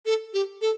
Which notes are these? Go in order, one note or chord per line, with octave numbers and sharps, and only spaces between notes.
A4
G4
A4